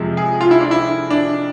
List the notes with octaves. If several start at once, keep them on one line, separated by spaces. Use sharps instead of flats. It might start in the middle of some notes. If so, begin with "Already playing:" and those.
Already playing: F2 C3 F3 G#3
G#4
F4
E4
D4
E4
D4